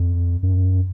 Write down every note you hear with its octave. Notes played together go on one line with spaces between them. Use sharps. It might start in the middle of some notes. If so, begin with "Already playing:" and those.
Already playing: F2
F#2